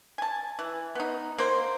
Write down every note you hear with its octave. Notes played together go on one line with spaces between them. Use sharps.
G#5 A5
E3
B3 D#4
A#3 C5